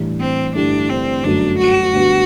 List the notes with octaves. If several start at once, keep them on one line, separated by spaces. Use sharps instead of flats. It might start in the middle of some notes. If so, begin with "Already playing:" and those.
Already playing: A2 E3 G3 D4
C4
G2 D3 A3 D4 E4 G4
C4
G1 F#2 F#3 A3 D4
F#4
D2 D3 G3 B3